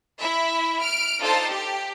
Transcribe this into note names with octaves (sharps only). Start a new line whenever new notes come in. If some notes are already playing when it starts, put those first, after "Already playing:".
E4 E5
F6 D7
D4 D#4 F4 A4 C5 A5
G4